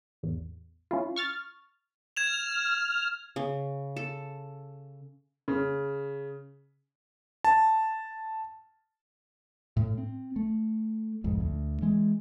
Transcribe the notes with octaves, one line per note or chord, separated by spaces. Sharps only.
A1 E2
C#4 E4 F4
C#6 F6 A6
F6 G#6 E7 F7
C#3
A4
C#3
A5
A2
C4
A3
B1 F2 G#2
D2
E3 G#3